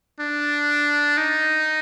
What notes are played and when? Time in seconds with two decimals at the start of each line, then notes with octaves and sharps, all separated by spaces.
0.20 D4
1.18 D#4